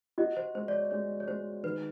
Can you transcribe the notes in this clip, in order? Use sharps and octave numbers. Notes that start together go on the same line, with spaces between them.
F#4 D#5
C5
G#3 C5
D5
C#5
G#3 C#5
C#5
G#3 C5
D#3 B4